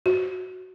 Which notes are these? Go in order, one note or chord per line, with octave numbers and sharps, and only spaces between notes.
F#4